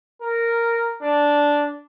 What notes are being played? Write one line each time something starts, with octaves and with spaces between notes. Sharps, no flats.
A#4
D4